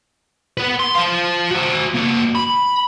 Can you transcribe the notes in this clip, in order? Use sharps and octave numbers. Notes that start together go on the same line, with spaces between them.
B4 F#5
C6
C5 F5
F#4 C5
A#3 F#4
B5